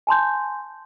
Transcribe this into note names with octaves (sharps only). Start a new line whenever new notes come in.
G#5 A5 C6 G6